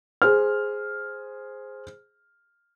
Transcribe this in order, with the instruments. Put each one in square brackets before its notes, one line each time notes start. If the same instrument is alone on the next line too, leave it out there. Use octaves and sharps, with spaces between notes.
[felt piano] G#4 C5 F6